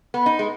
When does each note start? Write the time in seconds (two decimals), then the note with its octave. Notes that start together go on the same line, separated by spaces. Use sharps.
0.14 B3
0.26 D#4
0.39 G#3